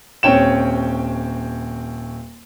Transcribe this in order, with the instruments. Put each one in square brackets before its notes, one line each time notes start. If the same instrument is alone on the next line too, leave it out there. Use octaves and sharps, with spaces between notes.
[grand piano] D#1 C4 C#4 C#5 G5 E7